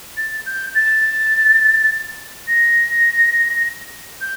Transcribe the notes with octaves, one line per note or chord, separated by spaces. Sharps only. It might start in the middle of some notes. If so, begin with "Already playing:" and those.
A6
G6
A6
A#6
G6